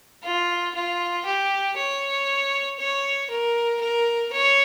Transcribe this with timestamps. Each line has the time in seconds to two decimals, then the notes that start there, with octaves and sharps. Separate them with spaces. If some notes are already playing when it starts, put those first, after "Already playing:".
0.24 F4
0.74 F4
1.26 G4
1.77 C#5
2.79 C#5
3.30 A#4
3.81 A#4
4.33 C#5